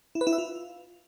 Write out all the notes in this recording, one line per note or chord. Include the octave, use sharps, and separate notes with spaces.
E4
B4
E4
E5
F4